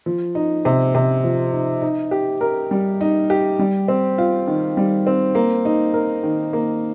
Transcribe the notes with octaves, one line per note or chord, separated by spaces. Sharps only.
F3
D#4
C3
C3
F3
D#4
D#4
G4
A#4
G3
D#4
G4
G3
C4
F4
D#3
G3
C4
A#3
D#4
A#4
D#3
A#3